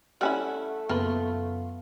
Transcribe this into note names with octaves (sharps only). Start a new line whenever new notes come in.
G3 A3 C#4 E4 E5 F#5
F#2 C#3 A#3 B3 F4 B4